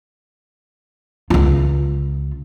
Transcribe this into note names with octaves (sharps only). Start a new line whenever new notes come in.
C#2 F4